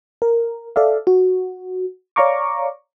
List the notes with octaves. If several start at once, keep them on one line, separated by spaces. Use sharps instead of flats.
A#4
A4 D5 E5 F5
F#4
C#5 D5 F5 A#5 C#6 D6